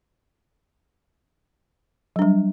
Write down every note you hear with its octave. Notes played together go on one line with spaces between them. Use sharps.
F#3 G3 D4